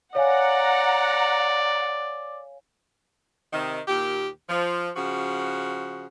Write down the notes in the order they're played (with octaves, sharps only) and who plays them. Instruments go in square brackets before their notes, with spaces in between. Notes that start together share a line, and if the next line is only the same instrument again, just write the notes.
[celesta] C#5 F5 G#5 [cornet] D5 [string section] F#5 A#5
[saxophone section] C3 D#3
D#2 A#2 G4
F3
C#3 F3 F#4